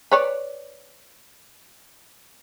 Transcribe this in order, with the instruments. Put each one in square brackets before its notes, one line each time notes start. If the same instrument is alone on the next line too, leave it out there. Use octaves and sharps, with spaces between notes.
[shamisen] B4 C#5 D5